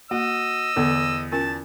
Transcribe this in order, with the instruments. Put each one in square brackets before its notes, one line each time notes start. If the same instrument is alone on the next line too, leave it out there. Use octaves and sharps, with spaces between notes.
[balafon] A#3 [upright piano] F#4 [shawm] D#5 [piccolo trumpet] E6
[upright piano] E2 [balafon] D3 B3 A4
[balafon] C#4 F4 A#4 [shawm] A5